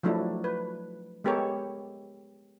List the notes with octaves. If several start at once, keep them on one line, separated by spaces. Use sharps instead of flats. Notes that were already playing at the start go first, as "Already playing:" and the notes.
F3 F#3 A3 D4 E4
B4
G#3 B3 G4 A4 A#4 C#5